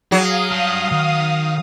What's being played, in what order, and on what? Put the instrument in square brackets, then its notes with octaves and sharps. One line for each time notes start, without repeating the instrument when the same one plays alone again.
[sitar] F#3 [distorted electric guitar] G#4 [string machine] F5 D#6
[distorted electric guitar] G3 A5
D#3